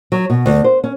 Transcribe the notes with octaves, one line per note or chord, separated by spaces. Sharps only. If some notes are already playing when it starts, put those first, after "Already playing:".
F#3
B2
D2
C5
C#4